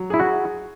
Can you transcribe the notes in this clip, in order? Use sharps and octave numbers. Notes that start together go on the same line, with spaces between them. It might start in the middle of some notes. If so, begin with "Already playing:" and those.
Already playing: F#3
E4 G#4
F#4